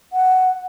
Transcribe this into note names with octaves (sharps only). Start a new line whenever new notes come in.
F#5